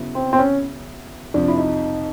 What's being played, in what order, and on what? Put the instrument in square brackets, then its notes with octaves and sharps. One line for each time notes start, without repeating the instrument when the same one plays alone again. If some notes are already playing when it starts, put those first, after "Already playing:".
Already playing: [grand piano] C#3 F#3 B3 E4
[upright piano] C4
C4
C#4
[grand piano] F2 C3 F3 [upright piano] D4
[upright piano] E4
D#4